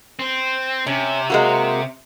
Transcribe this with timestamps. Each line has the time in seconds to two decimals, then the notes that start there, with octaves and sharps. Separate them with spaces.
0.19 C4
0.87 C3 C#4
1.30 G#3 A#3 F#4